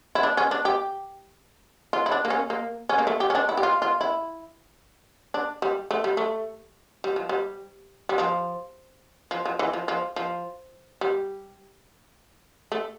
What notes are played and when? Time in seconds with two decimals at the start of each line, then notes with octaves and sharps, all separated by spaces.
0.15 E4
0.23 D4
0.37 C#4
0.51 D4
0.65 G4
1.93 F4
2.06 E4
2.12 D4
2.25 A#3
2.30 C#4
2.50 A#3
2.89 C#4
2.98 A#3
3.07 A3
3.20 G4
3.30 C#4
3.35 D4
3.49 E4
3.57 G4
3.63 F4
3.82 F4
4.01 E4
5.34 D4
5.62 G3
5.91 A3
6.04 G3
6.17 A3
7.04 G3
7.16 F3
7.29 G3
8.09 G3
8.18 F3
9.31 F3
9.45 F3
9.59 E3
9.73 F3
9.88 F3
10.16 F3
11.01 G3
12.72 A3